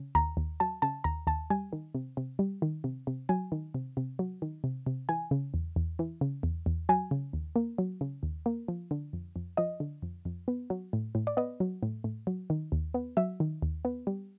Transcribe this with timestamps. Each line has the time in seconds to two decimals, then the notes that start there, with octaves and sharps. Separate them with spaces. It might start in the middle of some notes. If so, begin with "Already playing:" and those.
Already playing: C#3
0.15 D#2 A#5
0.37 D#2
0.60 F#3 A5
0.82 C#3 A5
1.04 D#2 A#5
1.27 D#2 A5
1.50 G3 G#5
1.73 D#3
1.95 C3
2.17 C3
2.39 G3
2.62 D#3
2.84 C3
3.07 C3
3.29 F#3 G#5
3.52 D#3
3.74 C3
3.97 C3
4.19 F#3
4.42 D#3
4.64 C3
4.87 C3
5.09 E3 G#5
5.31 C#3
5.54 E2
5.76 E2
5.99 E3
6.21 C#3
6.43 E2
6.66 E2
6.89 F#3 G#5
7.11 C#3
7.33 D#2
7.56 A#3
7.78 F#3
8.01 C#3
8.23 D#2
8.46 A#3
8.68 F3
8.91 D3
9.13 F2
9.36 F2
9.57 F3 D#5
9.80 D3
10.02 F2
10.25 F2
10.48 B3
10.70 F#3
10.93 A2
11.15 A2
11.27 D5
11.37 B3 D#5
11.60 F#3
11.83 A2
12.04 A2
12.27 F#3
12.50 D#3
12.72 D#2
12.94 B3
13.17 F#3 E5
13.40 D#3
13.62 D#2
13.85 B3
14.07 G3